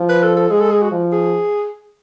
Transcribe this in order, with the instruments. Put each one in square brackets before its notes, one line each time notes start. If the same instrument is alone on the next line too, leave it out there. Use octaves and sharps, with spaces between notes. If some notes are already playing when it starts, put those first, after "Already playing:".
Already playing: [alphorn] F3
[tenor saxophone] B4
A4
A4
[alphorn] G#3 [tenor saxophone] G#4
[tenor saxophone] A4
G#4
F#4
[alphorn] F3
[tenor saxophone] G#4